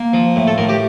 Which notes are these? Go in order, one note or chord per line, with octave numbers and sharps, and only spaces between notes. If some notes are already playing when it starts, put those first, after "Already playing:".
Already playing: A#3
F3
A2
A4
A2 A#4
G4